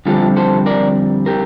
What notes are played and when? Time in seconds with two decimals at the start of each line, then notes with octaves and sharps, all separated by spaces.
0.06 F2 D3 G3 C4 F4 A4
0.36 A4 C5
0.66 A#4 D5
1.26 G4 A#4